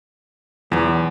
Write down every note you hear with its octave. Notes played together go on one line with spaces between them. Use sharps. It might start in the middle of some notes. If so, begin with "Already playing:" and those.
B1 E2 E3